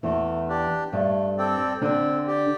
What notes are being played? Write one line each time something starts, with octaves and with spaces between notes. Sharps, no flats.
E2 E3 A3
D4 G4 D5
G2 G3 A3
C4 A4 D5 G5
D3 C4 D4
G4 D5 G5